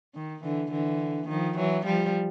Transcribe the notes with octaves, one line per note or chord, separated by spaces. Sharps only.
D#3
D3 E3
D3 E3
D#3 F3
E3 F#3
F3 G3